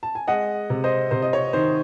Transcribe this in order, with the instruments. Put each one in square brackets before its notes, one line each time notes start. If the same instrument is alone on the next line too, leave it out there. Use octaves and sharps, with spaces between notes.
[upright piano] A5
G#5
G#3 D#5 F#5
C3
C5 D#5
C3 C5
D#5
C#5
D#3 C5